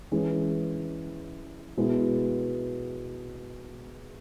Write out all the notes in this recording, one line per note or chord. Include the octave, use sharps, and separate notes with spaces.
E3 G#3 C#4 G#4
B2 G#3 B3 E4